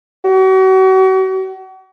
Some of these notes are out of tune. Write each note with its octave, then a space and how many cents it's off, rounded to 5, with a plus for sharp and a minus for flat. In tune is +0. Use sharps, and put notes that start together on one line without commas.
F#4 +40